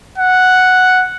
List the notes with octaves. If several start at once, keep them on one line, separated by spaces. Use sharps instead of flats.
F#5